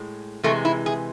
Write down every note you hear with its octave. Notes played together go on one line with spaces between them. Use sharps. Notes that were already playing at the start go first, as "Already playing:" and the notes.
Already playing: A2 G#3
C3 E3 G#3 A3
E4
G#4